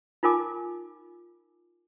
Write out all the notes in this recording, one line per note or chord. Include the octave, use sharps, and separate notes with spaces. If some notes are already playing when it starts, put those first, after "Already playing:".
D#4 F4 A#4 G#5 D6